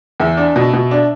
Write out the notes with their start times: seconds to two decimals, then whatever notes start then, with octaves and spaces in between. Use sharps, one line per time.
0.20 E2 E5
0.37 D4
0.56 B2
0.73 B2
0.91 D4